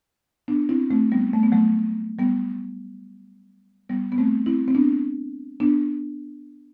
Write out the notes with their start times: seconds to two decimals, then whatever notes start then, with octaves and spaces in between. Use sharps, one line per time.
0.48 B3 D4
0.69 C4 E4
0.90 A3 C4
1.12 G3 B3
1.33 A3
1.43 B3
1.52 F#3 A3
2.19 G3 B3
3.89 G3 B3
4.12 B3
4.18 A3 C4
4.46 C4 E4
4.68 C4
4.75 B3 D4
5.60 B3 D4